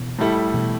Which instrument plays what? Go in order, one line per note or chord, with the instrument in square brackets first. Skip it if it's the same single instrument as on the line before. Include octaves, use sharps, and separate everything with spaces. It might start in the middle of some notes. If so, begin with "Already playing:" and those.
Already playing: [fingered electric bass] B2 E3
[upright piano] A2 G3 E4 A4
[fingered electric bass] B2 E3